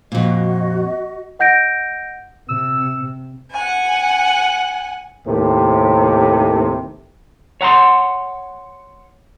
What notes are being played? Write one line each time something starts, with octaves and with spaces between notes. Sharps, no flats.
F2 A#2 F#4 D#5
D#5 F#5 G6 A#6 D7
C3 E6
F#5 G#5
D#2 A2 C3
C#5 F#5 A#5 C6